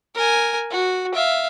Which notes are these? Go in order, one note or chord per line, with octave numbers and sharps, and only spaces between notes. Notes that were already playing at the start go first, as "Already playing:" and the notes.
A#4 G#5
F#4
E5 F5